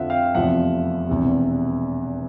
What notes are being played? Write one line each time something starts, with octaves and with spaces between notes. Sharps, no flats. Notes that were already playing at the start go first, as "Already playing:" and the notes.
Already playing: F2 D3 F3 E5 F#5
F5 G5
F1 E2 C3 F3 E5 F#5
E1 E2 C3